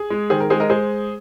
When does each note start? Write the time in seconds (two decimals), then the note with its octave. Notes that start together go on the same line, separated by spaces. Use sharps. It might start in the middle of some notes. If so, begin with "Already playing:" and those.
Already playing: G#4
0.10 G#3
0.30 D#3 G#4 C5
0.40 A#4
0.50 G#3 G#4 C5
0.60 A#4 D#5
0.70 G#3 G#4 C5